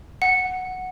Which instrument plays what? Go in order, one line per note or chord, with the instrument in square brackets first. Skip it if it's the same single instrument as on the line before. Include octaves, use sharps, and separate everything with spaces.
[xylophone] F#5